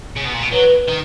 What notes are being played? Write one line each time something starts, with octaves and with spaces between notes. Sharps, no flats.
C#3
B2
A#2
B2
F#3 B4
D#3